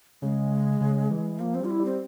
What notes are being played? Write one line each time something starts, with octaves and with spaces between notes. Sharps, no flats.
C#3 G#3
C#3
E3
F3 A#3
C4
G3 F4
E4
G3
C4